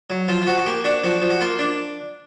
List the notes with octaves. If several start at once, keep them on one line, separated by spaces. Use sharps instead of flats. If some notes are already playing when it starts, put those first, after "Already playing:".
F#3
F3 F4
F4
F3 F#4
F#4
A#3 G4
D4 F#4
F3 F#4
F3
F#4
A#3 F4
D4